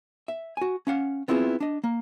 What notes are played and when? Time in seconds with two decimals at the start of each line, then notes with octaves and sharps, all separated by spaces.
0.28 E5
0.57 F#4 G#5
0.87 C#4 F5 F#5
1.28 B3 C4 E4 F4 G#4
1.60 D4 D#5
1.84 A#3